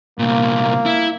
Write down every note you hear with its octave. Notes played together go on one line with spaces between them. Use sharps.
C2 A#2 A#3
E4